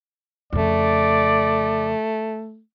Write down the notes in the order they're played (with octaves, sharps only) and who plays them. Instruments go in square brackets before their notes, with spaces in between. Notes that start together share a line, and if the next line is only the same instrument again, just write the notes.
[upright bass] F2 C#3 [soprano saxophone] A3 [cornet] D5